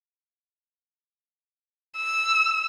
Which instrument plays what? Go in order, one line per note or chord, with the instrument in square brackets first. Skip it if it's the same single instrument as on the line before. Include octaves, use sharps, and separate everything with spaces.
[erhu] E6